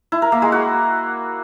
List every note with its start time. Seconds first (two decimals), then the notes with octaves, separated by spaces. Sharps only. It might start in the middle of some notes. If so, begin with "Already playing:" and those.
0.12 E4
0.22 A#4
0.32 A#3
0.42 G#3
0.52 F#4